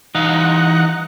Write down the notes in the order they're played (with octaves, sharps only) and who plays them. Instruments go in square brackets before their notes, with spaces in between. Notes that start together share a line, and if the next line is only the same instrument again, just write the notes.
[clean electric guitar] E3 G3 F5 [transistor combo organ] D#4 F#5